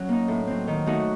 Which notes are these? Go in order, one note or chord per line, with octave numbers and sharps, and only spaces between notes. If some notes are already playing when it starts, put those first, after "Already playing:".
Already playing: F#3 C#4
A#3 D#4
A2
F#3 C4
D#3
A3 D#4 F#4